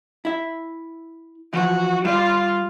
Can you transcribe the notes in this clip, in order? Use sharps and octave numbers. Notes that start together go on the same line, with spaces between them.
E4 E5
E3 F3 F#4
G3 F4 D5